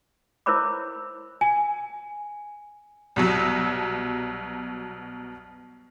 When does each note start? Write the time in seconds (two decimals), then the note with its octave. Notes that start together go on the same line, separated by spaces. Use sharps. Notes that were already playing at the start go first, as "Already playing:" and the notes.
0.46 E4 A#4 C5 C#5 B5 D6
1.41 G#5
3.16 C2 B2 F#3